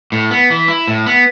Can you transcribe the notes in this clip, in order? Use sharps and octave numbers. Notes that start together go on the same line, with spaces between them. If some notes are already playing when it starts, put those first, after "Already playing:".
A2
B3
E3
E4
A2
B3